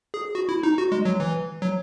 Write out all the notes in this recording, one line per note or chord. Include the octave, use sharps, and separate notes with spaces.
G#4
F#4
E4
D#4
F#4
G#3
F#3
E3
F#3